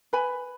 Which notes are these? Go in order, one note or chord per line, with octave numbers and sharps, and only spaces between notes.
B4 G#5 B5